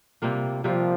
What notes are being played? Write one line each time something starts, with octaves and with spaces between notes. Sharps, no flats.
C3 G3 A#3 F4
C3 F3 G3 A#3 F4